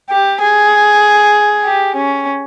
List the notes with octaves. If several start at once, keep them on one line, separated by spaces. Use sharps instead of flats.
G4
G#4
G4
C#4